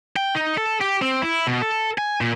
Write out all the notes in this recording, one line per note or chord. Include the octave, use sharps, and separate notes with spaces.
G5
D#4
A4
G4
C4
E4
B2
A4
G#5
A#2